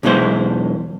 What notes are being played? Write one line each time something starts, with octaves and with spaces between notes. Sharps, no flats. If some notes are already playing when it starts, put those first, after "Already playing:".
B1 E2 B2 E3 G#3 C5